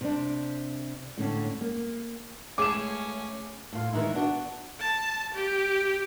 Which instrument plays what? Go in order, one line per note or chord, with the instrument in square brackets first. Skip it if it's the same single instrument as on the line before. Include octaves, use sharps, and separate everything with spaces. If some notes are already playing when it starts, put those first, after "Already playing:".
[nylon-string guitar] C3 D4
A2 D3 C#4
A#3
[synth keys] G#3 A3 G#4 [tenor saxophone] C#4 [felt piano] D6 E7
[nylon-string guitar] A2 F4
D#3 E3 G#3 D#4 E4
B3 D4 F#4
[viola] A5
G4